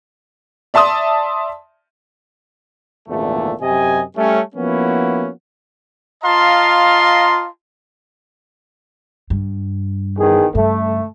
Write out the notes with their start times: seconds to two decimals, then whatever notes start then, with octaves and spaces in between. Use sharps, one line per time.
0.74 D5 E5 A5 C6 D#6
3.09 G#1 E2 A#2 D3 A3
3.62 F#2 C3 G4 D#5 G#5
4.16 G3 A3 C#4
4.55 F3 A#3 B3 C#4 E4 F#4
6.24 F4 D#5 F5 A5 A#5 C6
9.30 G2
10.18 E2 D#3 G#4
10.55 G2 C#3 A3